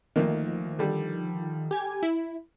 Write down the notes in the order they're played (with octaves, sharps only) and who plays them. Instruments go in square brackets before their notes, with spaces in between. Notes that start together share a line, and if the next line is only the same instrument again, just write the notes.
[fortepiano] D2 A#3 [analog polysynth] D#3 F3
[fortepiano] D3 G3
[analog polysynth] G4 G#5
E4